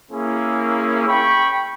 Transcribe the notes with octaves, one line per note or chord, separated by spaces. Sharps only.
A#3 C#4 E4 G#4
G5 B5 C#6